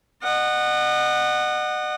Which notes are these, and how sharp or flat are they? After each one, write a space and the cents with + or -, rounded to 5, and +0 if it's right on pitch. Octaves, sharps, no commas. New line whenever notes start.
D#5 -35 F#5 +0